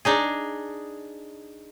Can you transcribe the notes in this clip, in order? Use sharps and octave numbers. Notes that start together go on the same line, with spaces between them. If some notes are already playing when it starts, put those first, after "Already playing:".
D4 D#4 G#4